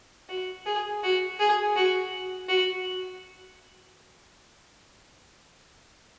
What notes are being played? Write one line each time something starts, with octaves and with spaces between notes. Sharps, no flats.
F#4
G#4
F#4
G#4
F#4
F#4